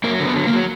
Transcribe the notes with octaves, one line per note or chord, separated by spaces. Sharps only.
F#3 A#3 A#4
D3
B3 B4
F#3
A#3 A#4
F#3